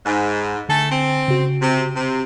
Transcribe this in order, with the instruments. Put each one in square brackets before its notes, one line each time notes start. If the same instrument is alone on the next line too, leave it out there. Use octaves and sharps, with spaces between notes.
[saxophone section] G#2 [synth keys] G#5 B5 F#6
[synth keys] D3 G#5 [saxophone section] A3 A4
[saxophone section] C4
[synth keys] C#3 F#4
[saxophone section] C3
C3